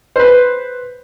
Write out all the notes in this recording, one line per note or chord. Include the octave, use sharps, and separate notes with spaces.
B4 C5